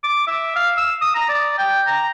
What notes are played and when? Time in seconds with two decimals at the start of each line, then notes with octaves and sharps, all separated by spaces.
0.03 D6
0.27 E5
0.56 F5
0.77 E6
1.02 D#6
1.15 A#5
1.28 D5
1.58 G5
1.87 A#5